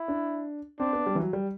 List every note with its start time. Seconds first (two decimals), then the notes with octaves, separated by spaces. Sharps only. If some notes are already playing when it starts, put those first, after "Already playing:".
Already playing: E4
0.08 D4
0.79 C4 D4
0.93 B3
1.06 G3
1.15 E3
1.20 F#3
1.33 G3